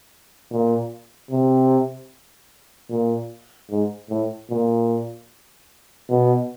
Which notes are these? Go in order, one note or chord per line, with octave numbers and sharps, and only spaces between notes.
A#2
C3
A#2
G#2
A2
A#2
B2